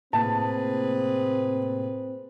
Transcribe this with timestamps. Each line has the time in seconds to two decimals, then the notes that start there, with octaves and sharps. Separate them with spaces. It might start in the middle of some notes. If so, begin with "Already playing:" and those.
0.13 A2 C3 A#3 C4 G#4 B4 A5